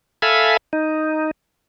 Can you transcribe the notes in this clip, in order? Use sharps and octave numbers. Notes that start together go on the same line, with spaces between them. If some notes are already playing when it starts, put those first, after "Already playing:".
A4 E5 F5 G#5 B5
D#4